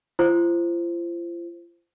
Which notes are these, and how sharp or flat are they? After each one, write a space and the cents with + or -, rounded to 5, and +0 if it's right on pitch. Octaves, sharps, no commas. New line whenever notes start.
F4 -40 C5 +0